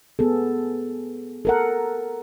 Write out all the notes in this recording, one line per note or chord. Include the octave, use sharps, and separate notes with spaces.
B3 G#4 A4
A4 A#4 F#5